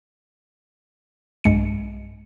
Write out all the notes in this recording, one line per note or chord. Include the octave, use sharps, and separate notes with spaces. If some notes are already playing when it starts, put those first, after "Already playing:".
B1 G2 G#3 C#7